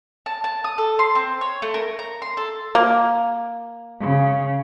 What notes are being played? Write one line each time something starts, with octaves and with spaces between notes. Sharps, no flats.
A5
A5
D#6
A4
C6
C4
C#5
A3
A#4
A#5
C6
A4
A#3
C#3